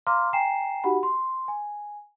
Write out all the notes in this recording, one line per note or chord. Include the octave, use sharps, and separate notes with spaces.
F5 A#5 C6 D6 F6
G5 G#5 A#5 C7 E7
D#4 F#4 G4 F#5 B5
C6
G#5